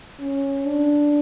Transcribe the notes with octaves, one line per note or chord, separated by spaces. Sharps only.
C#4
D4